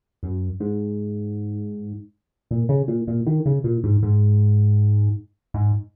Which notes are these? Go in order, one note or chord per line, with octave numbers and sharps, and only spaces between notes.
F#2
G#2
A#2
C#3
A#2
A#2
D#3
C#3
A#2
G#2
G#2
G#2